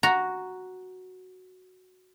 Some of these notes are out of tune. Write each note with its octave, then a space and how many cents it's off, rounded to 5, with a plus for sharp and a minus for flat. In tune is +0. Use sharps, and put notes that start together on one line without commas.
F#4 +0 A#5 +0